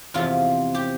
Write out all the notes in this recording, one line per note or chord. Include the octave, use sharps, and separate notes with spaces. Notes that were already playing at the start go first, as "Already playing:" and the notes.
E2 C3 F3 F4
G4